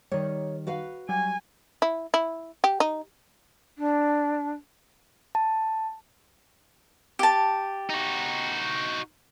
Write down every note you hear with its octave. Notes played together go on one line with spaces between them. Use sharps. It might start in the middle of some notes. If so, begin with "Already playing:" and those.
D#3 G3 C#5
F#4 B4 F5
F#3 G3 G#5
E4
E4
G4
D#4
D4
A5
G4 A5
D#4 F#4